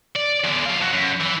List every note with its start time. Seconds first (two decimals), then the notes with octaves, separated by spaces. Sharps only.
0.16 D5
0.44 E2 D3
0.66 F#3 F5
0.80 F3 F#4
0.93 F#2
1.20 E3